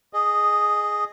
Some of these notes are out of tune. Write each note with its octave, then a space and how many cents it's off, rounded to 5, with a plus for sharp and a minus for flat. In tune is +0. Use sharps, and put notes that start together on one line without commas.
G#4 +0 D#5 -15